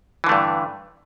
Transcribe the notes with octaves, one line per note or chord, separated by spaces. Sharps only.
G2 D3 E3 A3